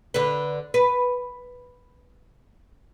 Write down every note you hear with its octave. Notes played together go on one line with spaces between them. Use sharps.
D3 B4
B4